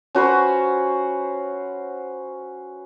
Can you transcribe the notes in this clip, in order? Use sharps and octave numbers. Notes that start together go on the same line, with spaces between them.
C#4 F#4 B4 C5